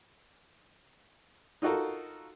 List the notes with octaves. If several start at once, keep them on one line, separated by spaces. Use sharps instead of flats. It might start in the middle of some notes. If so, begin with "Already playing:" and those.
D#4 F4 F#4 A4 A#4